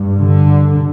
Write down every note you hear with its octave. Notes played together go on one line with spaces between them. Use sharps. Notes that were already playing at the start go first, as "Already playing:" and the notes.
Already playing: G2
D3